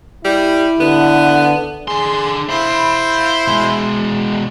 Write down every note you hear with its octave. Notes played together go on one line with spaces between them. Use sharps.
G3 E4
D3 B3
D3 G#4 C6
E4 C5 F5 B5
B2 G#3